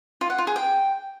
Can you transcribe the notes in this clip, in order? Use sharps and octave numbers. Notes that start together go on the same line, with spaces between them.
F4
F#5
F4
G#4
G5